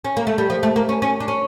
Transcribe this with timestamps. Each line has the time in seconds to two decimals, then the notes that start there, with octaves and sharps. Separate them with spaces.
0.05 C#4
0.17 A#3
0.27 A3
0.38 G3
0.50 F3
0.63 A3
0.76 A#3
0.89 C#4
1.02 C#4
1.20 D4
1.28 C#4